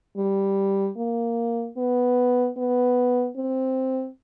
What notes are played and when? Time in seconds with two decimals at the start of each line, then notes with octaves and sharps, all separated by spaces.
0.17 G3
0.97 A#3
1.77 B3
2.57 B3
3.37 C4